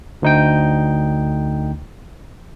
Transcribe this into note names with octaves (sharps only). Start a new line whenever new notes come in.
D2 D#4 G5